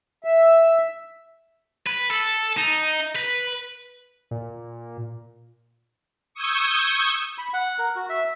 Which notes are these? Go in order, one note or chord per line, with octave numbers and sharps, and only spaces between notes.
E5
B4
A4
D#4
B4
A#2
C#6 D#6 E6 G6 G#6
B5
F#5
A#4
F#4
E5